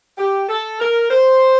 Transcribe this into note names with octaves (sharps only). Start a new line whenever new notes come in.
G4
A4
A#4
C5